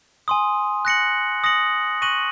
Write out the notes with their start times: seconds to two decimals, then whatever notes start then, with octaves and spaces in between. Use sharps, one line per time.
0.28 G#5 C6 D#6
0.85 F#6 A#6 C#7 F#7
1.44 D#6 A#6 C#7 F#7
2.02 C#6 F#6 A#6 D#7 F#7